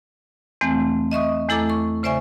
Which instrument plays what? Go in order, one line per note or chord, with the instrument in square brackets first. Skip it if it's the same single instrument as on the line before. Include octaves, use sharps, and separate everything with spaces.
[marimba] E2 E3 A3 C4
D#5 E5 C#6 D#6
E2 A3 E4 A4 A#5 D6
C#6
C#3 C5 D5 E5 G#5 C#6